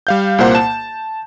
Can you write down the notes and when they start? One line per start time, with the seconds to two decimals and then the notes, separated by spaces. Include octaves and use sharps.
0.07 G3 F5 G6
0.38 C2 A#2 A#3 C5 F#5
0.55 A5 E7